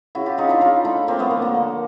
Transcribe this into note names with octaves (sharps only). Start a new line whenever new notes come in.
C#3 E4 F#4
F4 G4
C#3 D#4 F4
D4 E4
C#3 D#4 F4
A3 D4 E4
F3 A#3 C4
A3 B3
D3 A#3
A#3
D3